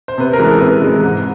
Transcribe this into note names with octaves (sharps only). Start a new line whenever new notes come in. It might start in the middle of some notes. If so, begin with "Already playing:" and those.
C5
C3 B4
A#4
E3 G#3
A4
C3 B4
E3 G#3
G#2